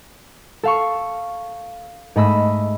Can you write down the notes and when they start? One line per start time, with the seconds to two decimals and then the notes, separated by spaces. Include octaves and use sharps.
0.63 A4 F5 C#6
2.16 G#2 A3 D#5 B5 E6